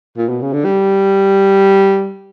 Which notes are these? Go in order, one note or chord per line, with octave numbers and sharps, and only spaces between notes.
A#2
B2
C#3
D3
G3